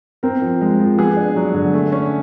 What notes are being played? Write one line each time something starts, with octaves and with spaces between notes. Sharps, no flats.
C4 A#4
F3
G#3
F3
B3 G#4
D4
F#3
D3
A3
C#4